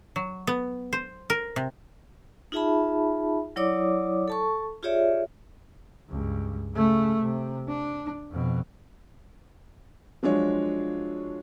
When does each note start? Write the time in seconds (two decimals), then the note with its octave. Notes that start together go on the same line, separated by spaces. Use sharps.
0.16 F#3
0.47 B3
0.93 C5
1.30 A#4
1.56 C3
2.52 D#4 F4 G#4 E5 A5 B5
3.56 F#3 E4 C#5 D5 D6 D#6
4.28 A4 A5 C#6
4.83 F4 G4 G#4 C#5 D5 E5
6.09 C#2 G2
6.74 C#3 A3
7.22 C3
7.68 D4
8.31 F2 B2
10.23 F3 F#3 G#3 D4 F4 C#5